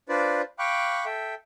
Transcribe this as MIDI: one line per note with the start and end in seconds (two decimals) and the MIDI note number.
0.09 0.42 62
0.09 0.42 65
0.09 0.42 71
0.09 0.42 72
0.09 0.42 74
0.59 1.05 77
0.59 1.05 79
0.59 1.05 83
0.59 1.05 85
0.59 1.05 86
0.59 1.05 90
1.05 1.34 69
1.05 1.34 76
1.05 1.34 79